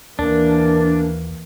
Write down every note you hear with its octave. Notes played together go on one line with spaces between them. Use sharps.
D#2 E3 A#3 D4 A#4